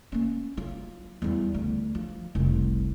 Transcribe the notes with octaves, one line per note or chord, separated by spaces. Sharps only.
A#3 C#4
F#3 F4
E2 G3
D2
F3
F1 C2